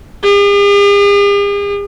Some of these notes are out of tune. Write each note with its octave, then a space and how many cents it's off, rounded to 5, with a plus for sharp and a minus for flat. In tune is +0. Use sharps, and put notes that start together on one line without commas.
G#4 -45